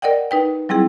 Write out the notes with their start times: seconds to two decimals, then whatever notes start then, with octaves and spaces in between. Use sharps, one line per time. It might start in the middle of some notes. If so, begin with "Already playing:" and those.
0.02 A#4 D5 D#5 F#5 G5
0.31 D#4 B4 G5
0.69 F#3 G3 C4 E4 G#4